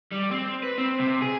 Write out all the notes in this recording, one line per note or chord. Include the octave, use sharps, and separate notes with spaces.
G3
C4
B4
C4
C3
G#4